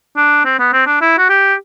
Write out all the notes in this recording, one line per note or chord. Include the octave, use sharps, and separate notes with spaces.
D4
C4
B3
C4
D4
E4
F#4
G4